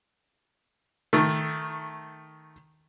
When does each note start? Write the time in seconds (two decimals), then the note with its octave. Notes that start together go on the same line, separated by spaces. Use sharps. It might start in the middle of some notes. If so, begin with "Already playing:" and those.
1.13 D#3 A3